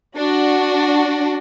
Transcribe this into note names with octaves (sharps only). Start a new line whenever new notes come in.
D4 F#4